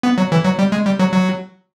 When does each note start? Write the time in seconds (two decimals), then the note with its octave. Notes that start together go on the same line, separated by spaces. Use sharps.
0.03 B3
0.18 F#3
0.32 E3
0.45 F#3
0.59 G3
0.72 G#3
0.86 G3
0.99 F#3
1.13 F#3